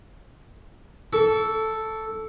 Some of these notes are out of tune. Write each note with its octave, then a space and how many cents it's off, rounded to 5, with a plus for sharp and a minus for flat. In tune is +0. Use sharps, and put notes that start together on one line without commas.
A4 +0 C#6 +45